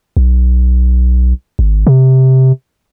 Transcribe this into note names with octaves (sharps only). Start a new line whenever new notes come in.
B1
G#1
C3